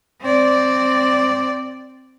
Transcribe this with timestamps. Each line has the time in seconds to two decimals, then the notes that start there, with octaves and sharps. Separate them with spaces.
0.21 C4 D5